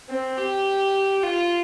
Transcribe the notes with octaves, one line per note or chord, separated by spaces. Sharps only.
C4
G4
F4